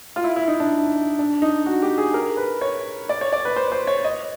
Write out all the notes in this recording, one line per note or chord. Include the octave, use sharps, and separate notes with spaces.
F4
E4
E4
D#4
D4
D4
D#4
F#4
G4
G#4
A#4
B4
C#5
D5
C#5
D5
B4
C5
C5
C#5
D#5